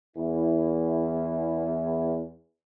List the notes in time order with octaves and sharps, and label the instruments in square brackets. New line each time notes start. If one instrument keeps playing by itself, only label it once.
[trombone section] E2 E4